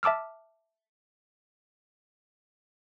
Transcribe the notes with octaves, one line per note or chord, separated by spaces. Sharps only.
E5 A5 D6 E6 F6